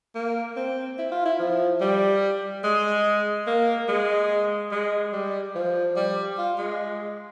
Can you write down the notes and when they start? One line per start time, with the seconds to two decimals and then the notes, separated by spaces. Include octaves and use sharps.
0.15 A#3
0.56 C4
0.99 E4
1.12 F4
1.25 E4
1.39 F3
1.81 G3
2.64 G#3
3.47 A#3
3.88 G#3
4.72 G#3
5.13 G3
5.55 F3
5.96 G3
6.38 F4
6.58 G#3